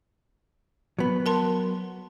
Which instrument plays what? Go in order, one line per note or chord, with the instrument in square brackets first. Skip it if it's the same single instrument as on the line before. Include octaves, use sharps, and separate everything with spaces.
[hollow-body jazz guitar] F#3 B3
[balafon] A#4 A5 C6